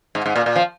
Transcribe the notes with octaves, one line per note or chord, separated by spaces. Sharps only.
G#2
G#2
A#2
A#2
F3